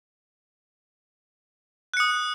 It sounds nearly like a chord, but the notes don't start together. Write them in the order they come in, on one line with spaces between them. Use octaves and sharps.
F#6 C#7 D#6